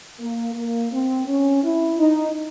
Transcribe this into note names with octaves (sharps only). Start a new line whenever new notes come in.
A#3
A#3
C4
C#4
E4
D#4